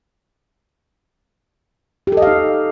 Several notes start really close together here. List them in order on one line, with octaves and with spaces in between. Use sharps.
G4 A4 D#5 F5 D#4